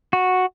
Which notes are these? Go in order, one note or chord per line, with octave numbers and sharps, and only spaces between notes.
F#4